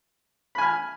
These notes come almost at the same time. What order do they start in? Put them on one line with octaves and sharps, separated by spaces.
B5 G#5 F6